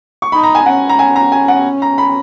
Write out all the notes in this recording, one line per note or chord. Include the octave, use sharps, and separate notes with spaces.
C#6
D#4 B5
A#5
G#5
C#4 F#5
A#5
G#5
A#5
G#5
F#5
A#5
B5